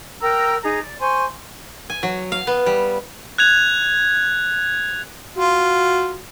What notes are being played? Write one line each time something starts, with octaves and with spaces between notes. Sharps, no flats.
A#4 G5 A#5 E6
D#4 G#4 A#5
D5
C5 G#5 C6 C#6
G#5
F#3
F5
B3
G3
F#6 G#6 F7
F4 F#4